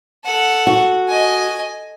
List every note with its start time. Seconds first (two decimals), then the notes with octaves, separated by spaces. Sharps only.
0.25 A4 F#5
0.67 F#4
1.09 D#5 G#5